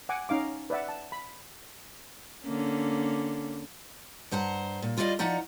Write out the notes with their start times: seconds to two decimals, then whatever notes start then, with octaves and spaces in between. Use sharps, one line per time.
0.09 F#5 G#5 D6
0.29 C#4 D#4 F5 D6
0.70 B4 D5 E5 F#5
0.89 A5
1.12 B5
2.44 D3 A#3 C#4
4.31 G2 C5 F#5 A#5
4.82 A#2
4.97 G3 F4 G#4 A4 D5 D#5
5.19 F3 D#4 D5 F#5 A#5